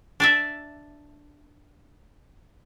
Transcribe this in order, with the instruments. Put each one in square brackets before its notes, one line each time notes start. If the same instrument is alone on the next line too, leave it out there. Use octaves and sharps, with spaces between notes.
[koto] D4 D5 E5